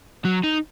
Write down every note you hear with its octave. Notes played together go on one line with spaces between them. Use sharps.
F#3
D#4